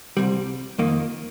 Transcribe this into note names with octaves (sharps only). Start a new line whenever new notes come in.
C2 C3 G3
F2 D#3 A#3 D#4